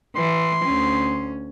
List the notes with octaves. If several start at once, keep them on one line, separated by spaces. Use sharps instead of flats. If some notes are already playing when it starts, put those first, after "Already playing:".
E3 C6
D2 C#4